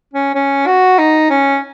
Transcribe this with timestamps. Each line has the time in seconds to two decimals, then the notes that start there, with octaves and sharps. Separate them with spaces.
0.14 C#4
0.35 C#4
0.67 F#4
0.99 D#4
1.30 C#4